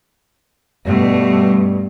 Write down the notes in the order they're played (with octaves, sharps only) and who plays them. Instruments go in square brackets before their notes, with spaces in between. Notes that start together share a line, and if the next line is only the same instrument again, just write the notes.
[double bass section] G2 [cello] B2 A3